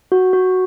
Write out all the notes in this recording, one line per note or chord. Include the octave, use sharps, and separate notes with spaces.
F#4
F#4